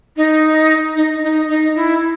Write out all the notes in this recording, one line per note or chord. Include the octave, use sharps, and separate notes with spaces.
D#4
D#4
D#4
D#4
E4